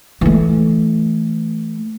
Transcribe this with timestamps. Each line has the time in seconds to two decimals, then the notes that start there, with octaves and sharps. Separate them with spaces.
0.21 E3 A3